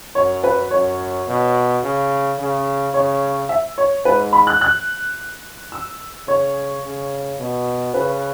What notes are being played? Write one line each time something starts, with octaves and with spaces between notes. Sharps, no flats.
F#2 C#5
B4
F#2 C#5
B2
C#3
C#3
C#3 C#5
E5
C#5
G#2 B4
B5
F#6
F#6
E6
C#3 C#5
C#3
B2
C#3 B4